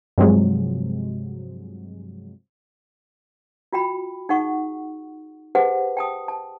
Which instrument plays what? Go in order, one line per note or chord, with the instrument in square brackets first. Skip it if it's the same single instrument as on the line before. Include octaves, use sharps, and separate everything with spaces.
[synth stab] G2 C3 F3 F#3 G#3
[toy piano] F4 F#4 G5 B5
D#4 G#4 F#5 C#6
G4 G#4 B4 C5 F#5 A5
G5 A5 D#6
A5